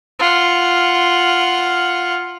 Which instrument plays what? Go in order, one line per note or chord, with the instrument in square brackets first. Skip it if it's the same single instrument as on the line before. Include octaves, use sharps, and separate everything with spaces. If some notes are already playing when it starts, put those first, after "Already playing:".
[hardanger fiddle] F4 F#5